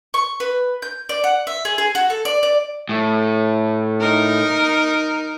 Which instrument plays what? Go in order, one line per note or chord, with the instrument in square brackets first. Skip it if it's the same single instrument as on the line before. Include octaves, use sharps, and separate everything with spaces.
[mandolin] C#6
B4
G6
D5
F#5
E5
G#4
G#4
F#4
A4
D5
D5
[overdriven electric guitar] A2
[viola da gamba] D#4 A#4